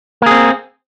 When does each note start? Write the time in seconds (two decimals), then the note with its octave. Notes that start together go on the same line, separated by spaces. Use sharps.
0.22 A#3
0.26 G#4
0.31 C4